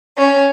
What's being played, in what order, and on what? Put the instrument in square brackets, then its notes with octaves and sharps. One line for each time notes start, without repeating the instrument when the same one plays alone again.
[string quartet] C#4